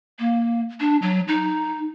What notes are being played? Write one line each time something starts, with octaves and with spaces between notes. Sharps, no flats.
A#3
D4
F#3
D#4